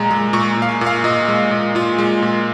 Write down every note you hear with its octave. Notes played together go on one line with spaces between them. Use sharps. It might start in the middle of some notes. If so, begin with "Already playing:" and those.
Already playing: A#2 G#3 A#5
G#3
A#2 C#6
A#2 F5
G#5
A#2
F5
A#2 D#5
G#3
A#2
A#2 F4
G#3
A#2